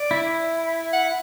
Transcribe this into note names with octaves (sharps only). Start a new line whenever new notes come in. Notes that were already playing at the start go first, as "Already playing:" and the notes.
Already playing: D5
E4
F#5